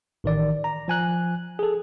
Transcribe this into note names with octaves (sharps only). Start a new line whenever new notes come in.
A1 D#3 D5
A#5
F3 G#5 F#6
G#4 A4